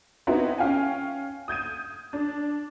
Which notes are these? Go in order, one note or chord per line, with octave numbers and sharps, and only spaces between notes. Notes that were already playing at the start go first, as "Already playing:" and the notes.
B3 C4 D#4 E4 F#4
C#4 F5 G5 G#5
D#6 G6 G#6 D#7
D4